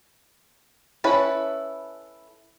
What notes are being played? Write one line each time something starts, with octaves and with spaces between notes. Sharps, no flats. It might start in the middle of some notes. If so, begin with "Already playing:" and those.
C#4 E4 A4 B4 B5